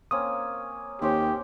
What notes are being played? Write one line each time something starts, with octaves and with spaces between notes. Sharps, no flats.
A#3 C4 C#4 D#6
D#2 C4 C#4 G4 C#5